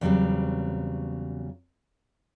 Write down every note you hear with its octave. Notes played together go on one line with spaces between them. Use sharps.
E2 C#3 F#3 G3 C4